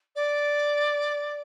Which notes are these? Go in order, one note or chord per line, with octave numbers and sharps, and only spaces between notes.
D5